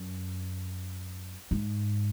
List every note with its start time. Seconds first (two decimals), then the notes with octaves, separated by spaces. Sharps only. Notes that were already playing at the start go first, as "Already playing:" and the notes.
Already playing: F#2
1.51 G#2